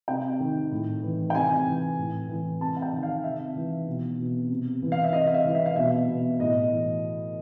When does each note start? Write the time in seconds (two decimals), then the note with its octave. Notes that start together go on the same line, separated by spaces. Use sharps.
0.08 C3 G5
0.40 D#3
0.71 A2
1.02 E3
1.30 G5
1.35 C3 G#5
1.66 E3
1.98 A2
2.29 E3
2.60 C3 A5
2.77 F#5
2.82 G5
2.93 D#3
3.03 F5
3.24 C3 E5
3.56 E3
3.87 B2
4.18 B2
4.50 C3
4.82 E3
4.92 F5
5.04 E5
5.13 C3 D#5
5.27 F5
5.34 E5
5.45 E3
5.55 E5
5.66 F5
5.76 B2 E5
6.08 B2
6.39 A2 D#5
6.71 E3